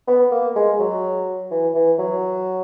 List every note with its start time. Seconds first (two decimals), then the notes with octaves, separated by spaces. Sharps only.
0.07 B3
0.31 A#3
0.56 G#3
0.79 F#3
1.51 E3
1.75 E3
1.99 F#3